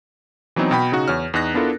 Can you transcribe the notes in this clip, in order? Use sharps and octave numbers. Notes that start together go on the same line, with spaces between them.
E3 F#3 B3 C4 D#4
B2 G5 B5
C#3 D#4 F#4 F#5
E2 C#5 F6
E2 D#4 F#6 A#6
B3 D4 E4 F4 A4 A#4